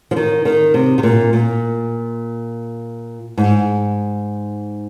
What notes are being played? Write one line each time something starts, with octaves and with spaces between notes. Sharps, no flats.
F3
D#3
D#3
C3
C3
A#2
A#2
G#2